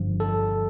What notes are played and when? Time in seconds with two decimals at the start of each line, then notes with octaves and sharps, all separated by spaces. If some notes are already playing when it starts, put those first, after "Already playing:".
Already playing: G1 G2 F3
0.20 A4